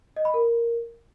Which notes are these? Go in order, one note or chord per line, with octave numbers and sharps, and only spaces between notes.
D#5
B5
A#4